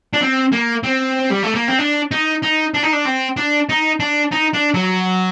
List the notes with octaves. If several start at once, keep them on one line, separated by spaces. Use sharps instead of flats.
D4
C4
A#3
C4
G3
A3
A#3
C4
D4
D#4
D#4
D4
D#4
D4
C4
D4
D#4
D4
D#4
D4
F#3